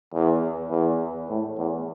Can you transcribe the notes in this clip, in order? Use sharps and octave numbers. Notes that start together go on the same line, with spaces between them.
E2
E2
A2
E2